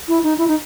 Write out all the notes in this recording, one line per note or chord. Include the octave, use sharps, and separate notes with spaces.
E4
D#4
E4
D#4